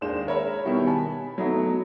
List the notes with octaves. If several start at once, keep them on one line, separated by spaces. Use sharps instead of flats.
D#2 G#3 D4 C5 E7
A#4 C#5 E5 B5
B2 D#3 G3 E4
G#5 A5 B5
F#3 A3 B3 D#4 E4